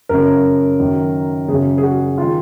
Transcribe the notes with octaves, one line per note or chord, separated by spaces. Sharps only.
F#2 C#3 A#4
F#2 D#3
F#2 C#3 G#4
G#4
F#4
D#3 F4